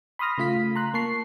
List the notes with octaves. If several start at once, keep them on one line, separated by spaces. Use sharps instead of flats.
B5 C6 D#6 F6 A#6
C#3 A3 F4 F5 B6
A#5 C6 F#6
A#3 A5 C#6 C7